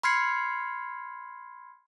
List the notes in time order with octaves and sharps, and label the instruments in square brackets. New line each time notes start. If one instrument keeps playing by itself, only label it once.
[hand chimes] B5 C6 F6 G#6 C7 C#7